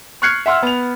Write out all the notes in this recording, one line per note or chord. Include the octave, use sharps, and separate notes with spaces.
C#6 F6 F#6 G#6 C7 C#7
E5 F#5 C6 E6 F6
B3 F7